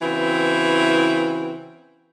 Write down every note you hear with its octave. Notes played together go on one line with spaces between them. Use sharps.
C#3 E3 C4 E4 F#4 B4